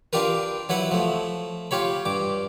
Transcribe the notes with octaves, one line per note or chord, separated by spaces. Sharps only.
D4 F4 G4 A#4 B4
F#3 E4 B4 F#5
F3 A3
F4 G4 C#5 B5
G2 D6